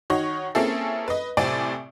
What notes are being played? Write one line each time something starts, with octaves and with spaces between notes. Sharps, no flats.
D#3 D#4 F#4 C#5
A#3 C4 C#4 E4 G#4 A4
B4 D#5
A2 C3 C4 D5 G#5 D7